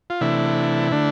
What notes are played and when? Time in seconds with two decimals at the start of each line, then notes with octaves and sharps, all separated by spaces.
0.10 F4
0.21 C3 E3 A3 D4 E4
0.91 D3 A3 D4